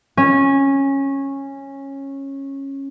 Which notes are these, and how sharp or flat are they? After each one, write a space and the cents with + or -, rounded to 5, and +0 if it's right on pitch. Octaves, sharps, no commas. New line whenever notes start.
C#4 -15